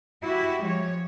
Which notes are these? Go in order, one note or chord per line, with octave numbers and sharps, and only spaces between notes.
E4 F#4 G4 E5
F3 G#3 C#5